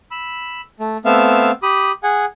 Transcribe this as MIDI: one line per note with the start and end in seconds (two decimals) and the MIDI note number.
0.11 0.61 83
0.11 0.61 88
0.80 0.97 57
1.05 1.51 57
1.05 1.51 59
1.05 1.51 60
1.05 1.51 76
1.05 1.51 77
1.05 1.51 88
1.63 1.92 67
1.63 1.92 83
1.63 1.92 87
2.03 2.25 68
2.03 2.25 78
2.03 2.25 80